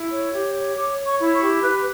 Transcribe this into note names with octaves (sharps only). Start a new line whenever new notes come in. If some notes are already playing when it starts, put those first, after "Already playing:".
Already playing: E4
C#5
G4
C#5
C#5 D6
C#5
C#6
E4
C#6
G4
B4